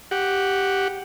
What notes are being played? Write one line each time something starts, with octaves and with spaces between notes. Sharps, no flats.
G4 F#5